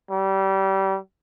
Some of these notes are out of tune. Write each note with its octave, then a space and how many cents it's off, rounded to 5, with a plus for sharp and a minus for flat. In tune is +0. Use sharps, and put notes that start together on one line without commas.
G3 -25